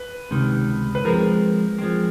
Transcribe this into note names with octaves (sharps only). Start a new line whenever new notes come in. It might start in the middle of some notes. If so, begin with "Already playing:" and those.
Already playing: B4
C#2 C3 D#3
B4
F3 G#3 C4 A#4
F3 G#3 C4